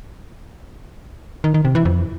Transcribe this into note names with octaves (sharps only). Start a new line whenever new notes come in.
D#3
D#3
C3
E3
F2